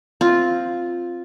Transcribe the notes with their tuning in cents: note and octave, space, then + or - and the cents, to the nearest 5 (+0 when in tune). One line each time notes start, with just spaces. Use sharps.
C4 +0 F4 +0